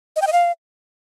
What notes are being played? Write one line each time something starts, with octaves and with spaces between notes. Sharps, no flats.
D#5
G5
D#5
F5